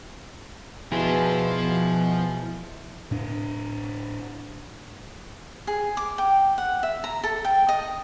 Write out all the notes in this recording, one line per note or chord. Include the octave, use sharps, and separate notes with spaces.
B2 F3 E4 F4 G#4
A2 D4
G#4
D6
G5
F#5
E5
A#5
A4
G5
D#5